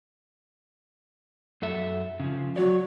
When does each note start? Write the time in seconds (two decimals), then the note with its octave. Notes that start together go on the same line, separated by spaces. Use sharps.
1.62 F#2 A4 E5
2.20 C#3 F3
2.56 F#3 F#4 C#5 D5